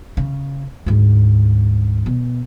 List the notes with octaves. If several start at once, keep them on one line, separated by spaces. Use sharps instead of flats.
C#3
D2 G#2
B2